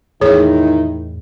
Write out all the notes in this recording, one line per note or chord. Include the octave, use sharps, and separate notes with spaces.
E2 A2 D#3 D#4 E4 G#4 C#5